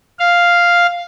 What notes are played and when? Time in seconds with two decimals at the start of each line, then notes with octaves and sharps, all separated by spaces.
0.19 F5